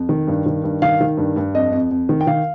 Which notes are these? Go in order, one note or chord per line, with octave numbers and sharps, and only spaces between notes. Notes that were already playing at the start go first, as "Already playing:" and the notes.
Already playing: F2
D#3
G2
D#3
G2
D#3 F5
D#3
G2
G2
F2 D#5
F2
F2
D#3
G5
D#3 F5